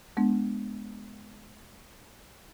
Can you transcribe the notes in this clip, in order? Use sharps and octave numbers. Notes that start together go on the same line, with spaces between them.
G#3 B3 D4